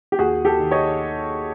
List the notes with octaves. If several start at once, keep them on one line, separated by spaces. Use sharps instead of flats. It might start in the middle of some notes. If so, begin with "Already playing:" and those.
G4
D#2 F#4 G#4
G4 A4
D#3
C#5 D#5